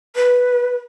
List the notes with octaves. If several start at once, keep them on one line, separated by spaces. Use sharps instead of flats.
B4